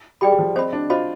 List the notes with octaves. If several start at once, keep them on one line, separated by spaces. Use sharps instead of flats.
G3 G#4 D5 G5 B5
G3
F3
C4 C5 D#5 B5
D4
F4 C5 D#5 B5